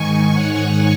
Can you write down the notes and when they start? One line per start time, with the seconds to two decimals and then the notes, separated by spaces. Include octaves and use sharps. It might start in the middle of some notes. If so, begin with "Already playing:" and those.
Already playing: G#2 D#3 G#5 C#6
0.34 C#5 F#5